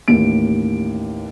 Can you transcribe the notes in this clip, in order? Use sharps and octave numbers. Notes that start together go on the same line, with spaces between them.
A1 D#2 D7